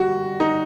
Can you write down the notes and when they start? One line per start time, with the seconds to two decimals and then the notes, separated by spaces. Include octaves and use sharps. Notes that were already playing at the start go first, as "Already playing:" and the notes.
Already playing: G3 F#4
0.40 D#4